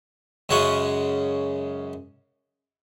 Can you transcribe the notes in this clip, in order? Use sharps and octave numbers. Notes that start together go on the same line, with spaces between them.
F#2 C#3 G#3 F#5 C#6 D#6